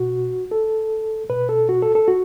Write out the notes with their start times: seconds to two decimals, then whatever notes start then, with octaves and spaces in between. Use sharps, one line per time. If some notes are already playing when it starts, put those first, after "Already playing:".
Already playing: B2 F#4
0.51 A4
1.30 B2 B4
1.49 A4
1.69 F#4
1.82 A4
1.95 A4
2.08 F#4